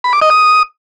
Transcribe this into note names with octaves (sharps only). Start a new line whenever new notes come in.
B5
D6
D#5
D#6